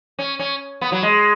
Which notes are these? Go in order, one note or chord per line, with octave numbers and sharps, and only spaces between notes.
C#4
C#4
B3
F#3
G#3